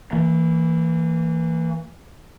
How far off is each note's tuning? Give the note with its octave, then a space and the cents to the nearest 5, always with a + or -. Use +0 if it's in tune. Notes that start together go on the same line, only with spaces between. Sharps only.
E3 +0 A#3 -30